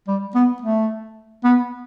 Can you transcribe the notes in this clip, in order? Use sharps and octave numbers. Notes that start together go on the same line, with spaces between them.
G3
B3
A3
B3